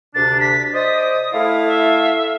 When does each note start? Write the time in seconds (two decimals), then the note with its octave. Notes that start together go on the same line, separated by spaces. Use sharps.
0.15 D2 C3 D4 A6
0.40 B6
0.74 C5 D5 D#5 D#6
1.34 A3 E4 F5
1.67 E5